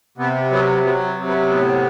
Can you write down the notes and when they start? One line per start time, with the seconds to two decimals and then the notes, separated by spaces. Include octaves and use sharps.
0.18 C3 B3
0.50 F#3 B3
0.83 F#3 B3
1.17 C3
1.27 B3
1.50 A2 B3